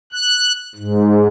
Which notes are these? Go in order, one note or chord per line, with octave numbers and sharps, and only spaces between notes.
F#6
G#2